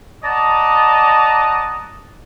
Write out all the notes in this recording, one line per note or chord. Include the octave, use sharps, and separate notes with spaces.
D5 D#5 F#5 A5 A#5 D#6